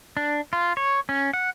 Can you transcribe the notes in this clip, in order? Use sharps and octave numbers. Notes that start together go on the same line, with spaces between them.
D4
F4
C#5
C#4
F#5